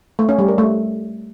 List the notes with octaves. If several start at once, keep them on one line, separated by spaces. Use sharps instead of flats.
A3
C#4
G3
A#4
A3